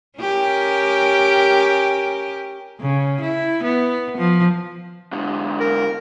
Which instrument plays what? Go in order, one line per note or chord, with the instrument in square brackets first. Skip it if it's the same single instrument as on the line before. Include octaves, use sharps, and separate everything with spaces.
[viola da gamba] C#4 G4 A#4
C#3
E4
B3
F3
[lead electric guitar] G#2 D3
[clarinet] A#4